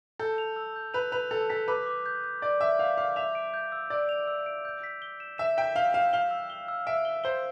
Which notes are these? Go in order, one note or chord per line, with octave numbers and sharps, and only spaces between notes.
A4 G6
F7
E6
G6
B4 F7
B4 F7
A4 F7
A4 B6
B4 D6
D6
G6
G6
D5 D6
E5 D6
F5 G6
F5 D6
E5 F7
D7
G6
E6
D5 E6
F7
E6
D7
G6
B6
G7
E7
E5 E7
G5 B6
F5 G7
F5 E7
F5 G7
E6
G7
E6
E5 D7
G7
C5 G7